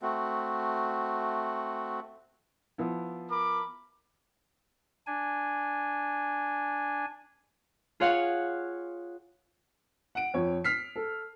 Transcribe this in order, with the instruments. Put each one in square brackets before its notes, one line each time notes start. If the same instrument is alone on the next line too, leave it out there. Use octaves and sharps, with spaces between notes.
[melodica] A3 C4 F#4
[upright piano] F3 B3 E4
[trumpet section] A#4 B5 D6
[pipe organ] D4 G#5
[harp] F4 G#4 C#5 F5 F#5
[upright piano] F#5 D7
F2 C#5
F6 B6 C7
A4